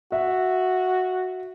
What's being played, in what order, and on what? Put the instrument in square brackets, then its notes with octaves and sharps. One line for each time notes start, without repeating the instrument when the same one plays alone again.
[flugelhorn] F#4 [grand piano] E5